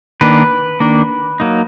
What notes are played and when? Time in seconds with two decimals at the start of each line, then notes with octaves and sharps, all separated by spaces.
0.21 D#3 A#3 D4 B4
0.80 D#3 A#3 D4
1.40 F#3 A#3 D#4